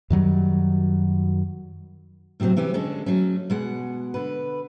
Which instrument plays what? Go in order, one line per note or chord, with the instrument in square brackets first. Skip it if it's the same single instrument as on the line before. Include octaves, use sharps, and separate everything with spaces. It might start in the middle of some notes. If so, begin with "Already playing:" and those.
[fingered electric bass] F#2 D#3 F#3 G3
[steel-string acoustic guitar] A2 C3 D#3 F#3 C4
C3 E3 C4 C#4 G4
D3 G#3 C#4 A4
F#3 A3 C#4
B2 G#3 F#5
D3 B4